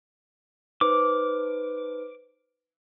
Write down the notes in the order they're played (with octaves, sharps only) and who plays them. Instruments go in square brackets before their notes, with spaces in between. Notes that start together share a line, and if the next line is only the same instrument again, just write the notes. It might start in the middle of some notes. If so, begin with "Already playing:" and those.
[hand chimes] D#4 B4 C5 [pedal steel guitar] D6